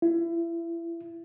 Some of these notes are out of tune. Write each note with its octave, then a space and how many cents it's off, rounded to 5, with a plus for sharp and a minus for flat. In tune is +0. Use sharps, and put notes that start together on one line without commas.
E4 +30